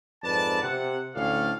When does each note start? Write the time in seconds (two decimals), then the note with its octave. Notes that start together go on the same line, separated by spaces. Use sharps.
0.23 F2 G#2 B4 D5 A5
0.62 C3 F#5
1.15 D2 A2 C#4 D4 A4 F5